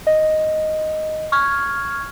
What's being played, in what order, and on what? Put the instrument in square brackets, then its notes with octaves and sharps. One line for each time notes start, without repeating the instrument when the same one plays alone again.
[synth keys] D#5
C#6 F6 G#6